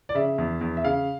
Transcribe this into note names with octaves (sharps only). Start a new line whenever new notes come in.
D5
C#3 E5
E2
E2
E5
C#3 F5